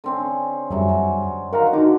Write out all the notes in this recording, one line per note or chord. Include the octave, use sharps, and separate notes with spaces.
D3 C4 C#4
F#2 F#3 G3 G#4 E5
F#3
D#3 F#4 A#4 F5 A#5
D3 D#4 F#4 D6